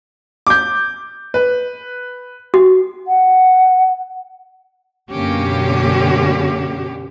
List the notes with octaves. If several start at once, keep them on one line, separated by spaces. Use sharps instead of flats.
D6 G6
B4
F#4
F#5
F#2 B2 D3 A#3 C#4 G4